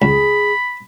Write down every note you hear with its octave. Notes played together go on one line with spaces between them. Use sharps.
C#2 G#4 B5